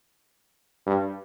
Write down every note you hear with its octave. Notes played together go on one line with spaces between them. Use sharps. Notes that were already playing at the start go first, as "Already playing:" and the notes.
G2